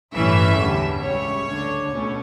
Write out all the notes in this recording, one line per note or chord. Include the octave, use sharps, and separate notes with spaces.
A1 G2 E3 A3 C#4 E5
E2 D3 G3
C#2 C#3 G3 C#5
D2 D3 A3 D4
C#2 B2 A3 C#4